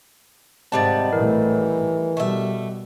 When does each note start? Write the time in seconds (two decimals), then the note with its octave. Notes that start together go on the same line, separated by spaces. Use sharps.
0.72 G#2 C3 D#3 G3 F#5 A5 A6
1.13 A1 A2 E3 A#4
2.17 B2 G3 A3 E5